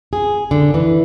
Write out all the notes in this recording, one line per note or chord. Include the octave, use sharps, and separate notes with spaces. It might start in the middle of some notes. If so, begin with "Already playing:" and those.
G#4
D3
E3